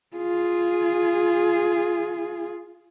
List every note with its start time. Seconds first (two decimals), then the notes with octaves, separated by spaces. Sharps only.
0.16 F4 G#4